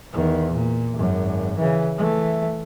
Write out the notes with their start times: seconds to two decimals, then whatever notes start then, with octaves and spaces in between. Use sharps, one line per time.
0.12 E2 D#3
0.52 A#2
0.94 G#1 F#2
1.57 C#3 E3
1.97 E3 A3